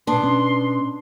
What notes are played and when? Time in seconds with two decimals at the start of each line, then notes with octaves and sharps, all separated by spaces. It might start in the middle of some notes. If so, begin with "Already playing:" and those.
0.07 B2 B3 D4 C6
0.24 C#4